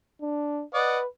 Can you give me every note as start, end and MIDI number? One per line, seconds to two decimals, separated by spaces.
0.21 0.63 62
0.74 1.06 71
0.74 0.99 74
0.74 0.99 75
0.74 0.99 78